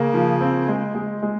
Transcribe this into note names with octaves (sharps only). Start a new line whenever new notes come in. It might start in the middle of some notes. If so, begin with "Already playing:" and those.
Already playing: C#3 A#3
F3
C4
G#3
G#3
G#3